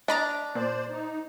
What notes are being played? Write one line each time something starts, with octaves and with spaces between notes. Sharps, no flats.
D4 D#5 A#5 A6
A#2 C5 D5
D#4